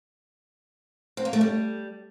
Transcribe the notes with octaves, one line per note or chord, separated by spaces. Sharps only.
C4
A#3
A3
G3